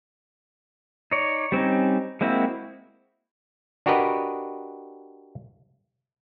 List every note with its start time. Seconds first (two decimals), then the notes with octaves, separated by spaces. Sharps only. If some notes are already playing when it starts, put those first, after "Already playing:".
1.11 D#4 C#5 D5
1.52 G3 C4 C#4 D#4
2.21 G#3 A#3 C4 E4 F#4
3.86 D4 F#4 G4 A#4 B4 D#5